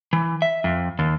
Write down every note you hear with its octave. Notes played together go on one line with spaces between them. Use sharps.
E3
E5
F2
D#2